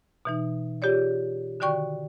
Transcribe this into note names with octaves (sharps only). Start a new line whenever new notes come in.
B2 E3 D#4
F4 G4 G#4 C#5 D5
D3 D#3 F#4 D5 G5 C#6